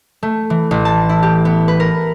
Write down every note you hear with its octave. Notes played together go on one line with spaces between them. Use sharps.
A3
E3
A1
A5
E4
G4
B3
B4
A#4